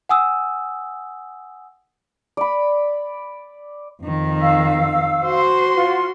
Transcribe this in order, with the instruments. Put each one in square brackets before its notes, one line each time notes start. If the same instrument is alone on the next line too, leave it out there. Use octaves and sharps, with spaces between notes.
[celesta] F#5 G#5 D#6 E6
[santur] D5 B5
[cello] F2 D#3
[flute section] F5 E6
[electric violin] F#4 C6 [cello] C5
[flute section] F4 F#5